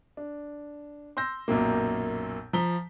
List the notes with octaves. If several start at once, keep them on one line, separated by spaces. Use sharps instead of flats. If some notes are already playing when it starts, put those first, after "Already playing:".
D4
C6 E6 G6 A#6
B1 F#2 A#2 A#3
F3 A#5 B6 G7